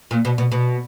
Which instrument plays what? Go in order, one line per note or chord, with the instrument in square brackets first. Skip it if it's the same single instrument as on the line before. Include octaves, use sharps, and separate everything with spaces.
[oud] A#2
B2
B2
B2